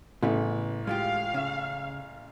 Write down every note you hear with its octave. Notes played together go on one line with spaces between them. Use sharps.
A1 C#3 B3
G#3 F4 G4 F5
C#3